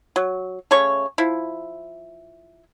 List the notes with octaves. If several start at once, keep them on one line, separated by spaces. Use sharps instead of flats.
F#3
C#3 A3 C#5 C#6
F3 E4